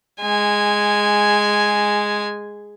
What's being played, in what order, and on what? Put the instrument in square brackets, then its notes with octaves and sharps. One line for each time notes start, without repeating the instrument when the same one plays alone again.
[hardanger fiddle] G#3 G#5